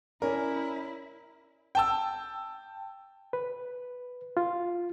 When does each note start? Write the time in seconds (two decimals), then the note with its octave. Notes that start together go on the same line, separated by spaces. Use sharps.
0.22 C#4 E4 A#4 D5
1.75 G5 A5 E6
3.33 B4
4.37 F4